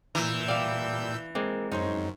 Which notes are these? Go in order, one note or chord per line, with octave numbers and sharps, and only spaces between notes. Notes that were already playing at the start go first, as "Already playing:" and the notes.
A#2 E3 A#5 E6 G6
G3 D4 D5 F5
G#3 A#3 C4
F#2 D#4 C5 C#5